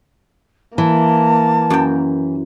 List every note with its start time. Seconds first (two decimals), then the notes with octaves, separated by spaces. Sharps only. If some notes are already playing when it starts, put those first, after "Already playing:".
0.78 E3 A#3 A5
1.70 F#2 G5